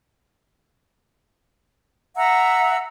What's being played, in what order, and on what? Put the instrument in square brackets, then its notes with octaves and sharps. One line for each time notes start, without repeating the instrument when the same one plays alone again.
[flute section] E5 F#5 A#5 E6